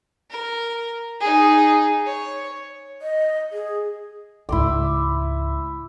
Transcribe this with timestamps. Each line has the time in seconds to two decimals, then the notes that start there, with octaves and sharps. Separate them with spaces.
0.31 A#4
1.20 D#4 G#4
2.06 C#5
3.02 D#5
3.52 G#4
4.49 C#2 G#2 E4 C6 D6